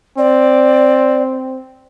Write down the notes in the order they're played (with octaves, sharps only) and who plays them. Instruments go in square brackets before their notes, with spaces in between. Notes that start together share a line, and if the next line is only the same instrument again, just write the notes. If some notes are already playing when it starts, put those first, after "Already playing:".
[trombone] C4 [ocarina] D5